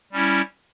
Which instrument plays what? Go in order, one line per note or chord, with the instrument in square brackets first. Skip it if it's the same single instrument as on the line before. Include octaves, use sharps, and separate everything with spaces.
[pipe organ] G3 C#4 E4